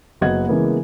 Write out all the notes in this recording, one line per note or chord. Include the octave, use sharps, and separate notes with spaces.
F#1 B3 F#4 D#5 F#5 G#6
C#3 E3 G#3 A#3 B3